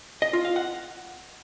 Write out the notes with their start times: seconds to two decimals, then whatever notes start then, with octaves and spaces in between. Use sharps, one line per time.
0.22 D#5
0.33 F4
0.45 F5
0.56 F#5